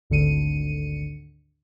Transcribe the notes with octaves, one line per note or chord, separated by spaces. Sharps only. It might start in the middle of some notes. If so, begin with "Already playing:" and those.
G#1 D2 D3 C#7 D#7